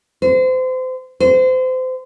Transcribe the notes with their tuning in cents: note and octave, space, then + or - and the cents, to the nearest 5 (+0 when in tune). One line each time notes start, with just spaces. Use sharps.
C5 -30
C5 -30